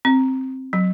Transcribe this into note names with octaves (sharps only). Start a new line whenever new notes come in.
C4
F#3